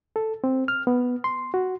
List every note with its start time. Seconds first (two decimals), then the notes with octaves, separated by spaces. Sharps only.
0.16 A4
0.44 C4
0.68 F6
0.87 B3
1.24 C6
1.54 F#4